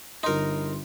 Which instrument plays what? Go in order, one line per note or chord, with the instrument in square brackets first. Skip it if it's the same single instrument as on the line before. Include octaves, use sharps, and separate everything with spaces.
[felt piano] G1 C6 [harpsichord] D#4 A#4